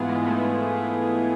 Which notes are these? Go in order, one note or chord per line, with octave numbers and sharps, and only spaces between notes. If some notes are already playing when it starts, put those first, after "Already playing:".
Already playing: G#2 E3 B3 E4 F4 G#4
G#3
G#3
G#2 E3 A3